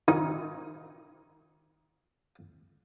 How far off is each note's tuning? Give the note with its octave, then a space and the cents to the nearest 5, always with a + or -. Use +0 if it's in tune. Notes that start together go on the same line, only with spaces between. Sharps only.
D#3 +0 D#4 +20